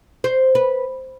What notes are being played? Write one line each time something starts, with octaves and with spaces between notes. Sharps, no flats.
C5
B4